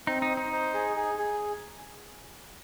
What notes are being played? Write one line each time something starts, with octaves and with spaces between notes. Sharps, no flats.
C4 D#4
D#4
C5
D#4
C5
G#4
G#4
G#4